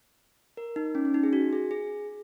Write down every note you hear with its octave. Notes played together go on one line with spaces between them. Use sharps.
A#4
D#4
C#4
C#4
D#4
G#4
F#4
G#4
G#4